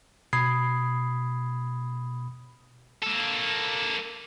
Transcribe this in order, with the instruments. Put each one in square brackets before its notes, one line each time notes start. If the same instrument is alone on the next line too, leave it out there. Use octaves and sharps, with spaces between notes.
[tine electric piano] B2 B5 D#6 G#6 C7
[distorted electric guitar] A#3 A4